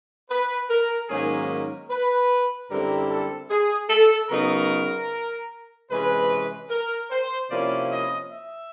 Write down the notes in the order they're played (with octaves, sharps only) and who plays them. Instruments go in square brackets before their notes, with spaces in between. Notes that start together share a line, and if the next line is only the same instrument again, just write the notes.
[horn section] B4
A#4
G#2 D#3 F#3 A#3 C#4 G#4
A#4
B4
F#2 D3 G3 C4 E4 A#4
A4
G#4
A4
C#3 F#3 B3 D#4 A#4
C3 E3 G#3 C#4 B4
A#4
C5
C3 F3 A#3 C#4 E4 D5
D#5
E5